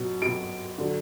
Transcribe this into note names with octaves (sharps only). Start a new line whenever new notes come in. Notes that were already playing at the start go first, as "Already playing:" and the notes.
Already playing: B2 F#3
B2 F#3 D7
D3 F#3